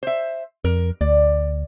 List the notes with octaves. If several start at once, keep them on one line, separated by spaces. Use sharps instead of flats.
C5 E5
F2 A#4
D2 D5